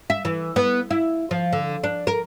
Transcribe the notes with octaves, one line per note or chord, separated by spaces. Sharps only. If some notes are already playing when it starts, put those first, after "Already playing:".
E5
E3
B3
E4
F3
D3
D4
A#4